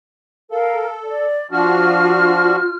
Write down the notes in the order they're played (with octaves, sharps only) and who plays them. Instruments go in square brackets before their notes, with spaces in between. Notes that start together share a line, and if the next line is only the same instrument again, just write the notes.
[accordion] A4 [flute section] A#4 F5
[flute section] D5
[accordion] F3 D4 F#4 [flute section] F4 F6